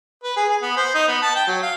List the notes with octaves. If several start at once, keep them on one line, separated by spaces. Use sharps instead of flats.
B4
G#4
G#4
B3
C5
D#4
B3
A5
G5
F#3
F5